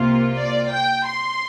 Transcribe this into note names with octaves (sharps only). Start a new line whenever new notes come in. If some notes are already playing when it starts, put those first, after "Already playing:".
Already playing: C2 C3 A#3 F4
D5
G5
C6